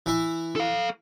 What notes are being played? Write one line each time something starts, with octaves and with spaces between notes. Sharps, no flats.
E3 E4
A4 F5